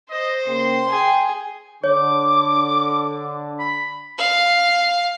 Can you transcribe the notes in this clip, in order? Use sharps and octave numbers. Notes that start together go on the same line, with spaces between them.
C5 D#5
C#3 A#3 G5 C6
G#4 G5
D3 C#5 D6
B5
F5